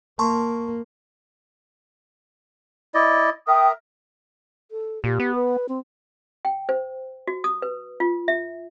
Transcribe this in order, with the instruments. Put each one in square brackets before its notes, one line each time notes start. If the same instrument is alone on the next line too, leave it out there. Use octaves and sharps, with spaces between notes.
[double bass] A#3 [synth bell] A5 C6 C#6
[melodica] E4 D5 D#5
[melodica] A#4 E5 [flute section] G5 D#6
[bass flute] A4
[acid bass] A#2 [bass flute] G4
[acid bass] B3
[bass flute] B4
C4
[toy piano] G5
C5
F#4
D#6
B4
F4
E5